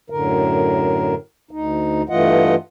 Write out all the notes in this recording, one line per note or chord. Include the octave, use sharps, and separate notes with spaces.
F#2 A2 D3 A#4
D2 D#4
G2 E3 A3 F4 D#5 F#5